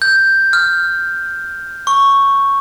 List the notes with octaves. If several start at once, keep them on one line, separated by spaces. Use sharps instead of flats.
G6
F6
C#6